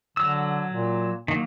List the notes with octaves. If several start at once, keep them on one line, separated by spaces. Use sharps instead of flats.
D3 F#3 E6
A#2
D#3 F#3 A#3